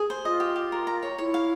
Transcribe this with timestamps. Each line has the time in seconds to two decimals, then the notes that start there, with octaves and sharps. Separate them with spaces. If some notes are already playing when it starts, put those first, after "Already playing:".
Already playing: G#4
0.10 C5
0.25 F4 D#5
0.40 G4
0.56 G4
0.72 A#4
0.87 A#5
1.03 C#5
1.18 E4 C#5
1.34 F5